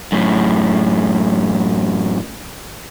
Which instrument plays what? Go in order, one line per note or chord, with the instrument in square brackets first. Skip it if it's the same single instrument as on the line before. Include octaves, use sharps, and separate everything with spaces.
[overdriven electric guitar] F#2 A2